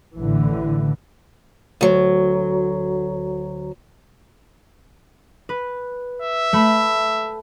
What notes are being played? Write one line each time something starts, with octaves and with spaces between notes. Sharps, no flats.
A1 A2 D3 E3
D2 F#3
B4
E5
A3 B5